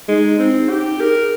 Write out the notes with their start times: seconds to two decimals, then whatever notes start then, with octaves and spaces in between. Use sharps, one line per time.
0.08 G#3 D#4
0.39 C4
0.54 D#4
0.70 G4
1.00 G#4 A#4
1.20 G#4